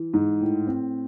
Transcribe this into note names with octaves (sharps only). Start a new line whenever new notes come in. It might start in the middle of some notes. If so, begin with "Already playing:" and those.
Already playing: E3
G#2
A2
C4